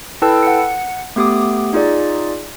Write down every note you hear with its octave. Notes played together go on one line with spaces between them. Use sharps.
E4 A4 B4 G5 A5 E6
F#5 C#7
A3 B3 G4 D6 D#6
D#4 F4 G#4 D5